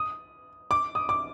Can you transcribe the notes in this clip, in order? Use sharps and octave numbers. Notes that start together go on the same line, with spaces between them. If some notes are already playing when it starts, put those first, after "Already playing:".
Already playing: D#6
D6
D#6
D6